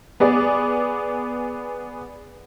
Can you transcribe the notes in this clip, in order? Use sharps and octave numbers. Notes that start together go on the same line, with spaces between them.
B3 G#4 D5